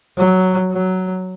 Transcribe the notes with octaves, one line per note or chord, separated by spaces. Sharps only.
F#3
F#3